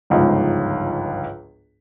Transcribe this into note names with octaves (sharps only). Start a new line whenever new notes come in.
G1 C#2 G#2 F3